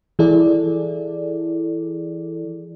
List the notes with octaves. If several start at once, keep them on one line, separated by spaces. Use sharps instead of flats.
E3 E4 G#4 A4 D5